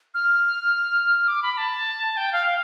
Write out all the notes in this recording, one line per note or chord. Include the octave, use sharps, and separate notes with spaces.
F6
D6
B5
A5
G5
F5
F5